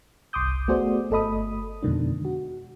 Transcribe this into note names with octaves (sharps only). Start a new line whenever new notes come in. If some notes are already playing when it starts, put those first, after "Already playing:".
G1 C2 C6 D6 D#6 G6
A3 B3 F#4 G#4 C5 D5
G1 A3 A4 D#5 B5 D#6
F2 B2 D3 D#3 G#3 D4
F#4